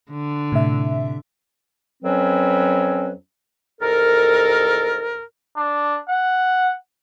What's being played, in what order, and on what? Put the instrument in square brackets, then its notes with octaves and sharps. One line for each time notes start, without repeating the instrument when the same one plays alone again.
[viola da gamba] D3
[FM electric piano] A2 C3 E5
[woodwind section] F2 F#3 C4 C#4 B4
C2 G#2 A4 A#4
[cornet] D4
F#5